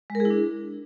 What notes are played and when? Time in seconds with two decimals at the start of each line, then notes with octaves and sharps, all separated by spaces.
0.10 G#3
0.15 A#4
0.20 G#4
0.25 E4
0.30 D4